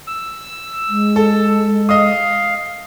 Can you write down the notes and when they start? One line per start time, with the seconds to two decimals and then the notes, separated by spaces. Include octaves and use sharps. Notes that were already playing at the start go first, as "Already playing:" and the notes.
0.07 E6
0.89 G#3
1.16 A4
1.89 D#5 F5 D#6